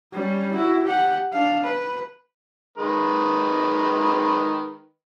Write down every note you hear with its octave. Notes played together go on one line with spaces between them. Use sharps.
G3 C#4
E4 F#4
G4 F#5
D4 F5
B4
D#3 G#3 B4